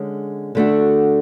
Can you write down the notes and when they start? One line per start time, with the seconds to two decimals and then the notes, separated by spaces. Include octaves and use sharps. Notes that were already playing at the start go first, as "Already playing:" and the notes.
Already playing: D3 G#3 C#4
0.55 D3 A3 D4 F#4